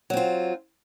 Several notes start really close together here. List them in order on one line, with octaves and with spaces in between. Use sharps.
F#3 C4 F4